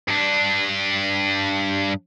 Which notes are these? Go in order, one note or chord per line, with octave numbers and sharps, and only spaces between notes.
G2 D4